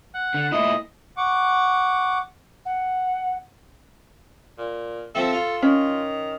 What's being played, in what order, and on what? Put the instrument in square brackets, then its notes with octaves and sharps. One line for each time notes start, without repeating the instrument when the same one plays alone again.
[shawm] F#5
[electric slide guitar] D3
[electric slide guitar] A#2 E4 [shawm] D#5
[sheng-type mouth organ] F#5 C#6 D6
[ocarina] F#5
[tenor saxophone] A#2
[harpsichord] F3 C4 E4 [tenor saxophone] A4
[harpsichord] F4
[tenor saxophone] D#3 [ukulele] C#4